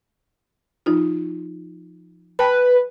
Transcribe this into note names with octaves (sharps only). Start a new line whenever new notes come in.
F3 D#4 F4
B4 G5 A5 B5